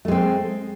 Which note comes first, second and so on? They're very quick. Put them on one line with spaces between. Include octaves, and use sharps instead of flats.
A3 G#3 C4